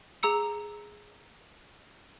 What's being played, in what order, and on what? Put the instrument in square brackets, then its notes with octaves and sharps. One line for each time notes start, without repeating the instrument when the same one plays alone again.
[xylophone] G#4 A#5 E6 C#7